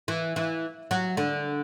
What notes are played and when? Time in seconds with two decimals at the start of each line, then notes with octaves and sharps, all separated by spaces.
0.08 E3
0.36 E3
0.91 F#3
1.17 D3